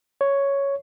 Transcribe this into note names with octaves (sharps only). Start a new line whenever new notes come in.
C#5